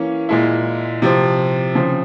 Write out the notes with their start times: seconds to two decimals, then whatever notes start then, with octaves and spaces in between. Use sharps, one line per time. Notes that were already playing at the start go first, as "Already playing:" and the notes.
Already playing: E3 A#3 C#4
0.29 A#2 G#3 E4
1.02 C3 F3 C4
1.75 C#3 F3 C4